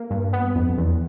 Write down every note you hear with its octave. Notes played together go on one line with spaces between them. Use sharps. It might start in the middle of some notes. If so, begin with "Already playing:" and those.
Already playing: A#3
G2
B3
F2
E2